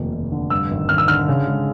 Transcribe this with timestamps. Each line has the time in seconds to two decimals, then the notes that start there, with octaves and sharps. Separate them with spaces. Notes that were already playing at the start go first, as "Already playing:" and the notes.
Already playing: F1 D#2
0.13 F1
0.32 D3
0.50 G2 E6
0.71 G#1
0.89 G#1 F6
0.98 E6
1.08 D3 F6
1.28 C#3
1.47 G#3